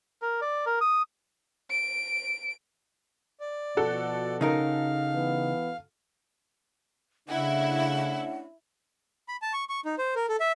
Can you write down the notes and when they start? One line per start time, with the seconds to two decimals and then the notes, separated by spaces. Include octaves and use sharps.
0.22 A#4
0.41 D5
0.66 A#4
0.81 D#6
1.71 D7
3.40 D5
3.77 B2 F3 F#4 A4
4.41 C#3 D#4 A#4 F5
5.14 E3 B3
7.29 C#3 A3 C#4 D4 E4 F#5
9.28 B5
9.42 A5
9.53 C#6
9.69 C#6
9.85 D#4
9.98 C5
10.15 A#4
10.29 A4
10.40 E5